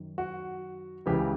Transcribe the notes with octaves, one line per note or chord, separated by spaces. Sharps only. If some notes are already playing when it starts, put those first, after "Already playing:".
Already playing: F#2 D#3
F#4
C#2 C#3 E3 G4